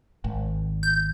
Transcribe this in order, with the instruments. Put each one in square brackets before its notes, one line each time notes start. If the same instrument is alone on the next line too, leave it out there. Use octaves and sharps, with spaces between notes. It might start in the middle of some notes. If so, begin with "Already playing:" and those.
[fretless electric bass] G#1
[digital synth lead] G6